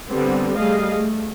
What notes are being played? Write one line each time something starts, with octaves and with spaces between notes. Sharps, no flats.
D3 G3 B3 C4
G3 A3 G#4 D#5 F5
A3